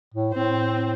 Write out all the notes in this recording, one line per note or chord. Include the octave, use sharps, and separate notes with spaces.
A2
A2 C4